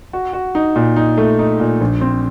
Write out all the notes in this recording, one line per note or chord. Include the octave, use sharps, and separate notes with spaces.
F#4
F#4
D#4
A#2
D#4
A3
D#4
A#2
A#1
C4